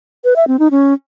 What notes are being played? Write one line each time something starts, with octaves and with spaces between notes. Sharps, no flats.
B4
E5
C4
D#4
C#4